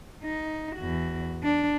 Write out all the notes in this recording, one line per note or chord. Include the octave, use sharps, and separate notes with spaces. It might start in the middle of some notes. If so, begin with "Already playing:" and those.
D#4
E2 F#4
D4